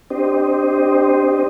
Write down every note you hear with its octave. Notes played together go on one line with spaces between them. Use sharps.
C4 D4 G4 C5 D#5